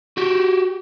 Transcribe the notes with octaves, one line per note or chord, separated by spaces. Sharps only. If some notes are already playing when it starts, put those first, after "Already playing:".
F#4 G4